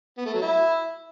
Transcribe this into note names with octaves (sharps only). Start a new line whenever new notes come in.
B3
A3
F#3
E4